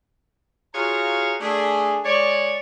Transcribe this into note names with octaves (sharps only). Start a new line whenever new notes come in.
F4 F#4 G#4 C#5 F5 A#5
A3 D4 G#4
G#3 C#5 D5